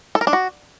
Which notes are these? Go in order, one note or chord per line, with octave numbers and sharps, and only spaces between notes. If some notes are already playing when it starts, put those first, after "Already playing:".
A4
A#4
D4
F#4